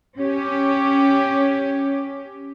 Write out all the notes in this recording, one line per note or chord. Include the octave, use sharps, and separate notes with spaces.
C#4 G4